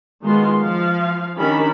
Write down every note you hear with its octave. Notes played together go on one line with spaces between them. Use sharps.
D#3 G#3 B3 F4 F#4 C6
F3 F5
D#3 C#4 D4 G4 A#4 B5